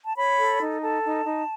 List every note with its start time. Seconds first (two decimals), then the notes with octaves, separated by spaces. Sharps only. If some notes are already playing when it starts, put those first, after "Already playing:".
0.05 A5
0.16 C#5 B5
0.38 A4
0.60 D#4
0.82 A4 A5
1.03 D#4
1.25 D#4